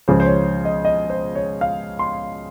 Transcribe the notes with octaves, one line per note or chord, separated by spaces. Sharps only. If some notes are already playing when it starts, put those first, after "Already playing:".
C#2 C#3 F3 C5
C5
C#5
D#5
D#5
C5
C#5
F5
C6